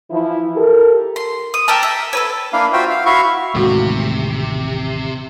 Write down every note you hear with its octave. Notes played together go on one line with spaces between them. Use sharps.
E3 F3 E4
G4 A4 A#4
C6
D#6
G4 A4 A#4 A5
E5
A4 B4 C#5
A#3 D4 E4 F5
F4 F#4 C5 E5 G5
F5
E4 F#4 E5 F5 C#6
A1 D#2 A2 C3 G#3 A3 F#4